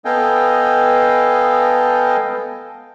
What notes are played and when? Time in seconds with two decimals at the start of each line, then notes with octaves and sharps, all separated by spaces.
0.05 B3 A4 D#5 F5 G5 G#5